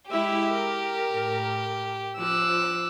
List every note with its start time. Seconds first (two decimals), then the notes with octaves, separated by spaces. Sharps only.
0.11 G#3 E4 G4 E5
0.51 A#4
1.14 A2
2.19 F3 D6 E6 F#6